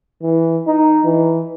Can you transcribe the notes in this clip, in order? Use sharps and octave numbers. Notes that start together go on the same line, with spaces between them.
E3
D#4
E3